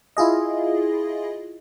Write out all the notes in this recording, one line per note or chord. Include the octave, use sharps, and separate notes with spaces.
E4 F4 G#4 D#5